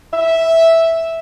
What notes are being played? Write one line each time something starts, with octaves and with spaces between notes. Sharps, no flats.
E5